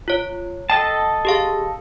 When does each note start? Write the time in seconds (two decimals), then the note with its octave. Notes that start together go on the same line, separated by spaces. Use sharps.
0.08 F4 C#5
0.70 A4 D#5 G5 A5
1.25 G4 G#4 F5